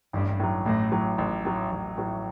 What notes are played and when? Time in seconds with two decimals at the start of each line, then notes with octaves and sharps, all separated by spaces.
0.13 A1 G2
0.40 A2 F#3
0.65 A1 A2
0.92 A2 F#3
1.18 A1
1.45 A2 F#3
1.71 A1
1.98 A2 F#3